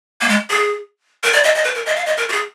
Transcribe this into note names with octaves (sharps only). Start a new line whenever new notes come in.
A#3
G#3
G#4
A#4
D5
D#5
D#5
B4
A#4
D#5
F5
D#5
A#4
F#4
G#4